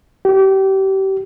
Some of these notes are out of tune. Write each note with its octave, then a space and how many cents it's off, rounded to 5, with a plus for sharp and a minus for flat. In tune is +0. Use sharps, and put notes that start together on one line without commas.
G4 -30